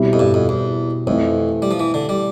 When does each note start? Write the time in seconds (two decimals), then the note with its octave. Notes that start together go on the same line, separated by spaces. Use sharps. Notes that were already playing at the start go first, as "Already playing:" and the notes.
Already playing: B2 G3 C4 E4 G4
0.13 F2
0.19 G2
0.34 F2
0.49 E2
1.07 F2 E3 A3 C4
1.62 G3
1.71 F3
1.80 E3
1.94 D3
2.09 G3